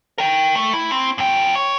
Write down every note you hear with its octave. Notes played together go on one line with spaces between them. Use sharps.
A#4 G5
A3
E4
C4
F#2 G5
C#5